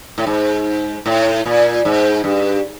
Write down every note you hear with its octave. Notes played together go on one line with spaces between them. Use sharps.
A2
G#2
A2
A#2
G#2
G2